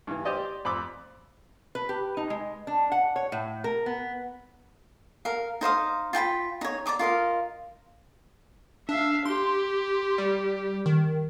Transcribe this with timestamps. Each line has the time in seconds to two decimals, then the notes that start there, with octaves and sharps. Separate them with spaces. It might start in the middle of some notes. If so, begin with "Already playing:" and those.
0.07 G2 E3
0.25 G4 C5 D5 D#5
0.65 F2 B5 C6 D6 E6
1.75 B4
1.89 G4
2.17 D#4
2.30 G#3
2.67 D4
2.92 F#5
3.16 C#5
3.32 A2
3.64 A#4
3.86 B3
5.25 A#4 F5
5.61 D#4 C5 F5 D#6
6.13 F4 G5 A5 B5
6.61 D#4 C#5
6.86 D5 A#5 D6 D#6
6.99 F4 A#4 D#5 F5
8.89 D4 E5 F5
9.25 G4 C6
10.18 G3
10.86 D#3